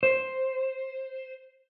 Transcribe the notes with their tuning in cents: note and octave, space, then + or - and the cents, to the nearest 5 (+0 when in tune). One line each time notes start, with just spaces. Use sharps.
C5 +5